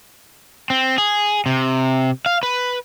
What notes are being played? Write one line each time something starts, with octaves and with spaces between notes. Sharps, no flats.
C4
G#4
C3
F5
B4